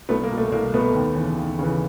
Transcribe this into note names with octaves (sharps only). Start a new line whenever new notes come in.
C2 A3 B3
A#3
B2
A3
C2 A#3
B2 A3 B3
D#2
C#3 E3
D#2
C#3 E3